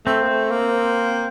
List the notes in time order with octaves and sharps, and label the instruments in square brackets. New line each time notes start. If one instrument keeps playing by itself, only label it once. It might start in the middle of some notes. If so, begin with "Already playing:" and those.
[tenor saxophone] A3 [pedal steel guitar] C4
[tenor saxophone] A#3
A3
A#3